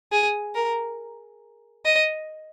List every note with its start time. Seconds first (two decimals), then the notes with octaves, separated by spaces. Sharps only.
0.12 G#4
0.55 A#4
1.85 D#5